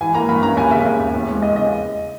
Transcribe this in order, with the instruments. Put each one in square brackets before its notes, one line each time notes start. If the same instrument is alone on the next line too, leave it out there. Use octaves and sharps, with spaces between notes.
[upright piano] E3 G#5
A#3 A#5
G2 B5
C#4 A#5
D#2 G#5
C#3 E5
D#2
D#2
E2
G#3
E2 D#5
C#3 D#5